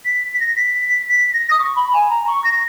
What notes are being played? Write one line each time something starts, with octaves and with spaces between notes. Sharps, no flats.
B6
B6
A#6
B6
B6
A#6
D#6
C#6
B5
G#5
A#5
C#6
A#6